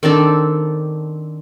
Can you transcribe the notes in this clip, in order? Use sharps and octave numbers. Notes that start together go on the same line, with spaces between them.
D#3 C4 D4 A4